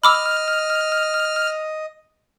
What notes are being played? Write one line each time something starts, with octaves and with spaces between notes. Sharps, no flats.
D#5 B5 D6 E6 F6